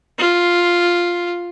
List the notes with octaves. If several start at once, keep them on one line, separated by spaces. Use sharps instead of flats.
F4